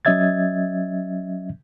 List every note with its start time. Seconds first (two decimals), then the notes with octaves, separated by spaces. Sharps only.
0.05 F#3 C#4 D#5 E5 G#6 A6